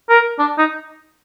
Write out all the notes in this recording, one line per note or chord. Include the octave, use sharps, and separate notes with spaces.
A#4
D4
D#4